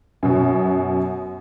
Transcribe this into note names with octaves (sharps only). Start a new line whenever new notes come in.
F#2 B2